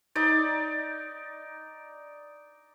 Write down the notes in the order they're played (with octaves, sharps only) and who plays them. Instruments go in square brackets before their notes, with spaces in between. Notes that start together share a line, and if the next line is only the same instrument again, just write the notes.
[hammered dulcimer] D#4 D5